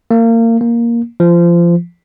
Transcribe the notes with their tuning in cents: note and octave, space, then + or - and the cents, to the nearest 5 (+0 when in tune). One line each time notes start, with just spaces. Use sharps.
A#3 -30
A#3 +5
F3 -25